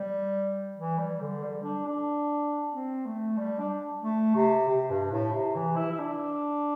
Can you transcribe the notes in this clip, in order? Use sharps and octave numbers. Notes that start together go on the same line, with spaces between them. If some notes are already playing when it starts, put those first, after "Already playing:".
Already playing: G3
E3
G3
D3
G3
D4
D4
C4
A3
G3
D4
A3
C3
C3
G2
A2
C3
E3
E4
E4
D4